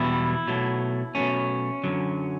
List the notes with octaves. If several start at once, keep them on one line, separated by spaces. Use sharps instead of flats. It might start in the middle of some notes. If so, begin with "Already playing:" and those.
Already playing: E2 B2 G3 E4
B2 F#3 A3
B2 F#3 A3 C#4
F#2 D3 F#3